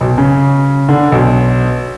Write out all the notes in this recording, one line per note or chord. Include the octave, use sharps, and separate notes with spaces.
B1
C#3
D3
B1